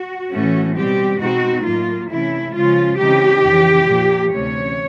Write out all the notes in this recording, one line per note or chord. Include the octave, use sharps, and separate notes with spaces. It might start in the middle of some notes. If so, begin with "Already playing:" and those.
Already playing: F#4
A2 E3 A3 C#4
B2 G3 C4 G4
B2 G#3 C4 D#4 F#4
A2 F#3 A#3 F4
C3 E3 A3 C#4 E4
C#3 F3 G#3 C#4 F4
C#3 E3 G#3 C4 D#4 G4
F2 C#3 E3
A#2 F3 A#3
D2 C3 E3 A3 C#4 C#5